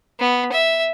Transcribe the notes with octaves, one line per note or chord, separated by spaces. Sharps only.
B3
E5